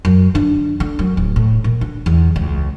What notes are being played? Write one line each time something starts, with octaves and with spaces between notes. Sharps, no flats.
F#2
D3
D3
F#2
D1
A2
A#2
D3
E2
C#2